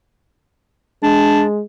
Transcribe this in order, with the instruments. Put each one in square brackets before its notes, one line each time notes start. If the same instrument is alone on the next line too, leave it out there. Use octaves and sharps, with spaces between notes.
[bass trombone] G#3 [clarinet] D4